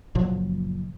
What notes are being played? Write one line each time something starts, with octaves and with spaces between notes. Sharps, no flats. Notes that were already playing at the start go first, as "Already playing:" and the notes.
F#1 A#2 F3 F#3